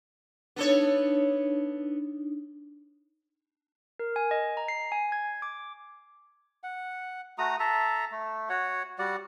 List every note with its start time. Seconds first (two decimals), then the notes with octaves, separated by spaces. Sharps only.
0.56 B3 D4 D#4 A4 C#5
3.99 A#4
4.16 G#5
4.31 D#5
4.57 A#5
4.68 C7
4.92 G#5
5.12 G#6
5.42 D6
6.64 F#5
7.38 A3 F#4 A#5 D#6
7.60 A4 E5 A5 A#5
8.12 A3
8.49 F#4 C#5 F#5
8.99 G3 F#4 D5 F#5